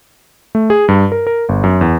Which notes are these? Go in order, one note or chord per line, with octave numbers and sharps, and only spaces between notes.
A3
G#4
G2
A#4
A#4
G1
F#2
E2